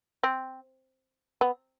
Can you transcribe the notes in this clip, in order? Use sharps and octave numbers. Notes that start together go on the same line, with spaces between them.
C4
B3